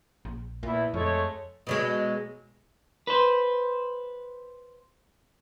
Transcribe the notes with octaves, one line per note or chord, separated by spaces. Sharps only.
A#1
E2 A#2 E4
F2 G#3 A3 C#5
B2 F#3 G#3
B4 C5